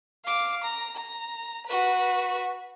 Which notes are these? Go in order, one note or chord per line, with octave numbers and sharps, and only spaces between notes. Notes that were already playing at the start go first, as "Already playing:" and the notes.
F5 D6
A#5
A#5
F#4 B4